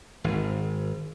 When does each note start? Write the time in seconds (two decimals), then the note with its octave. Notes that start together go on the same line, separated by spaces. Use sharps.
0.24 G#1